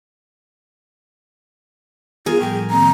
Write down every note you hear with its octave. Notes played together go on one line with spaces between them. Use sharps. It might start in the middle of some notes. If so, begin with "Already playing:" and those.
B3 F4 G#4 A#4
A2 F3 G3 G5
D#3 A#3 C4 A#5